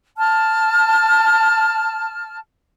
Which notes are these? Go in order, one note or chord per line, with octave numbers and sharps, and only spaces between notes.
A5 F6